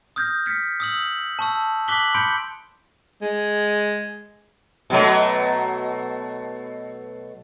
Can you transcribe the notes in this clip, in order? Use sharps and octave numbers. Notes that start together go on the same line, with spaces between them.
D#6 F6 G6 G#6 A#6
F6 G#6 B6 C#7
D#6 E6 F#7
A5 C#6 E6
A5 D6 F#6 B6 F#7 G7
B5 C6 G6 C#7 D7 F#7
G#3
B2 F#3 A3